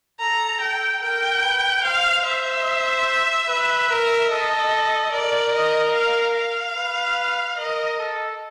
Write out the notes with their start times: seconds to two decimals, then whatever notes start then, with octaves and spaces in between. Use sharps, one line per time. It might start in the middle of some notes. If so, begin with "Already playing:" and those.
0.20 A4 A#5
0.61 A4 G5
1.02 A#4 G5
1.43 B4
1.84 C5 F5
2.25 C5 E5
3.48 B4
3.90 A#4
4.30 A4 D#5
5.12 A#4 D5
5.53 D#5
5.94 F5
6.35 F5
6.76 B4
7.58 A#4 D#5
7.99 A4